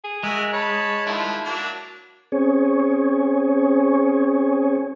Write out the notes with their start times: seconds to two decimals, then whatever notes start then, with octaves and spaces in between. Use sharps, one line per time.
0.05 G#4
0.23 G#3 F#4 A#4 E5
0.53 C#5 A5 B5
1.06 D3 D#3 F3 E4
1.45 F#3 A#3 D4
2.32 C4 C#4 G#4 C#5